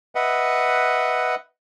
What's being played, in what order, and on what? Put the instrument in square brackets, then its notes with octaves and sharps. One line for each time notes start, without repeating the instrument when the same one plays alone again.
[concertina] B4 D#5 E5 F#5